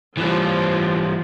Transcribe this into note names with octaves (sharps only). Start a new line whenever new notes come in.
E3 F3 G3